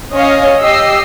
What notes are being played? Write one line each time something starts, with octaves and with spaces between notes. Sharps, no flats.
C#4 C#5 D#5 F5
G4 D#5 E6 C7